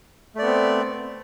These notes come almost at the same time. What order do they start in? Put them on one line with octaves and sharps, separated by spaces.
A3 D5 B3 C4